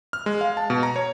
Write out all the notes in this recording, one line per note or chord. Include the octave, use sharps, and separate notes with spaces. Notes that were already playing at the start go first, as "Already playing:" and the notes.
F6
G#3
F5
A5
B2
A#5
C#5